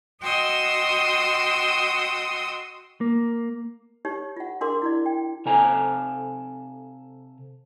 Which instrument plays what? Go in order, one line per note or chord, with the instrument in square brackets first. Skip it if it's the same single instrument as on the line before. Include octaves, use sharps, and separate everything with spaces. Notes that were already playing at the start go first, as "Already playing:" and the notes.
[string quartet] F#4 D#5 G5 C6 D#6 E6
[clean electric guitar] A#3
[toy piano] D#4 G4 C#5
F4 F#5
D4 F#4 G#4 A#4 C6 D6
E4 F#4 D5
G5
[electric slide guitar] C3 A4 G#5 A#5